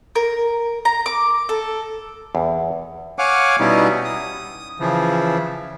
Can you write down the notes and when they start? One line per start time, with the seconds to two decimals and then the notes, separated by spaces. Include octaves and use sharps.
0.15 A#4
0.85 A#5
1.06 D6
1.49 A4
2.35 E2
3.19 C#5 F5 F#5 G#5 D6
3.60 B2 G3 B3 C#4 D#4 E4
4.05 D#6
4.80 C#3 E3 F3